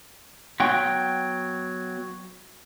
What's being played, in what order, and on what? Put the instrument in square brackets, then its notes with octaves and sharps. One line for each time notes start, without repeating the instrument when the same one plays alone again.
[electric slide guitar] F#3 B3 G5